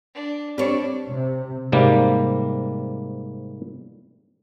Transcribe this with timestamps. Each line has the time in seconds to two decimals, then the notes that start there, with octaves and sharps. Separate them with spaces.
0.15 D4
0.58 G3 C4 D4 C#5
1.07 C3
1.72 G#2 C3 G3 A#3